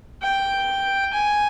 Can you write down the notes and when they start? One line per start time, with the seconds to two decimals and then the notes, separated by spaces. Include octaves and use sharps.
0.22 G5
1.13 G#5